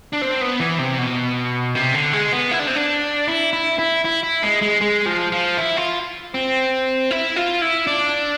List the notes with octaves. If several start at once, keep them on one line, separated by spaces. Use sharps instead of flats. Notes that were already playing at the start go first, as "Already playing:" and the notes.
D4
C4
B3
E3
C3
B2
C3
D3
G#3
B3
E4
D4
C4
D4
E4
E4
E4
E4
E4
G#3
G#3
G#3
F3
F3
E4
F4
C4
E4
F4
E4
D4